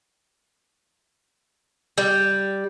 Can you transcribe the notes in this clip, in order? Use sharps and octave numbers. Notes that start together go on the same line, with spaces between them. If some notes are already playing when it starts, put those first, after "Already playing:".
G3